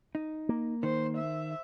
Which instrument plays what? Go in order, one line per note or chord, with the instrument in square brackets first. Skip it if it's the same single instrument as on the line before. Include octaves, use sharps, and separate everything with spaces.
[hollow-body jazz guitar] D#4
[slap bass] A#3
[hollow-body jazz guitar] D#3 [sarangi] C5
[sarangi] E5